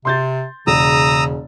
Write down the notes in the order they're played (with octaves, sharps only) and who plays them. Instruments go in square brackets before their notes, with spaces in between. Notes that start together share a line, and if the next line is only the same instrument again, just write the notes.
[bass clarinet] C3 [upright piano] C6 G6 A6
[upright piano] E1 [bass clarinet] C#3 [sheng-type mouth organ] A#5 D#6 E6